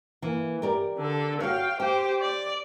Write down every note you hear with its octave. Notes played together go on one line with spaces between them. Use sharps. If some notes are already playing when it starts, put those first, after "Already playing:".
E3 A#3
G4 A#4 D5
D3 A4
F#4 C#5 F5 G5
G4 C5 G5
D5